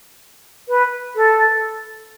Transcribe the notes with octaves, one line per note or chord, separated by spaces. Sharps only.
B4
A4